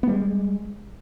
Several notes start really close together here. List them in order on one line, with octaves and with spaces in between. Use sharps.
B3 G3 G#3